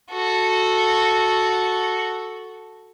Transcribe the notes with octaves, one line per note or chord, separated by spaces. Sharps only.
F#4 A4